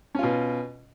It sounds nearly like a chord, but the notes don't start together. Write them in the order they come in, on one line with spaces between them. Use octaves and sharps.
C#4 F4 B2